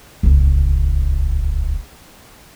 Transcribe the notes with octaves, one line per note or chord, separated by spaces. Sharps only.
D#1 C#2